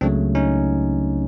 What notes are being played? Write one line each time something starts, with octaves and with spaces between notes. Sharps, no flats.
C#2 C#3 F#3 A3 C4 D4
C#4 D#4